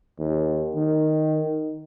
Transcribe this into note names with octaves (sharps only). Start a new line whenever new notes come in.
D#2
D#3